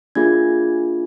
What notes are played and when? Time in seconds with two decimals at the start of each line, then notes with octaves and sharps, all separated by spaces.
0.15 A#3 D4 F4 G#4 G#6